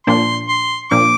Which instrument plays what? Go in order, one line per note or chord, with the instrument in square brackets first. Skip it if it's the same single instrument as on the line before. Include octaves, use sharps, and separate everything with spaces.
[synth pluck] A#2 F3 A#3 D4 [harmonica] C6
[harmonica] C6
[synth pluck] A#2 F3 A#3 D4 [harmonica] D6